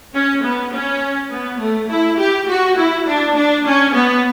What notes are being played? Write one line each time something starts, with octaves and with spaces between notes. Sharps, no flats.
C#4
B3
C#4
B3
A3
E4
G4
F#4
E4
D4
D4
C#4
B3